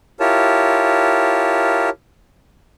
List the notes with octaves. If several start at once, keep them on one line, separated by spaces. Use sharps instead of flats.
E4 F4 G4 A#4 C#5 A5